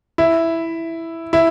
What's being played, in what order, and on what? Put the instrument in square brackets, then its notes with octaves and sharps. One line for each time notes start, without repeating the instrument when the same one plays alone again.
[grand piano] E4
E4